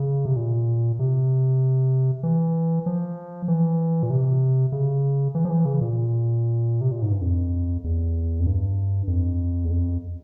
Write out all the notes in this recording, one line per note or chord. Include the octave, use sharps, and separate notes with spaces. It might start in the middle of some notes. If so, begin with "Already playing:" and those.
Already playing: C#3
C3
A#2
C3
E3
F3
E3
A#2
C3
C#3
E3
F3
E3
C#3
A#2
C3
A#2
G#2
G2
F2
E2
F2
G2
F2
E2
F2